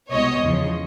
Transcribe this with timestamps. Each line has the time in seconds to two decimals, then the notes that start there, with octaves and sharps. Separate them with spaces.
0.10 C2 B2 G#3 C#5 D#5
0.41 E2 C#3 F3